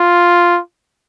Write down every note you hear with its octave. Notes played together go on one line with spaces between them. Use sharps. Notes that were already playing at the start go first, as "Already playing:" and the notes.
Already playing: F4